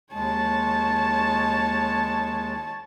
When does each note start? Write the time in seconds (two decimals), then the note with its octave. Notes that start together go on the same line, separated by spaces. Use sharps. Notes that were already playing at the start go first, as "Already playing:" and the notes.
0.13 D#2 G#3 C#5 A5